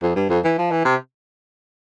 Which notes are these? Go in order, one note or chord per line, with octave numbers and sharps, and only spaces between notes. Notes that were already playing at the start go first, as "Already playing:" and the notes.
F2
G2
F2
E3
F3
E3
C3